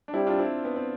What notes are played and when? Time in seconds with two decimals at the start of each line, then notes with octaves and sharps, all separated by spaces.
0.08 D4
0.14 G3 C4 E4
0.27 D4 F4
0.39 C4 E4
0.65 B3
0.76 C4